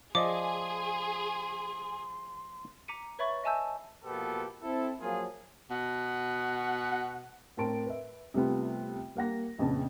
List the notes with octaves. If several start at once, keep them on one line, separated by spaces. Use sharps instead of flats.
F3 G#4 D5 D#5 C6 D6
A#5 D6 B6 C#7 D#7
B4 C#5 E5 B5 C#6 A6
D#5 E5 G#5 A5 E6 G6
B2 F3 A#3 B3 G4 A4
C4 E4 A4
F3 F#3 A#3 F4 G#4
B2 F#5
A2 C4 A#4 A5 C6 D7
B4 E5
C3 G3 A3 B3 F4
G3 A#3 F#5 A#6
A#1 F2 C#3 B3 A5